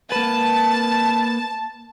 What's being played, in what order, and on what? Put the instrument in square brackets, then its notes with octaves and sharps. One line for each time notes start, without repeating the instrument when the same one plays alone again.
[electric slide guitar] A#3 B4 [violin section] A5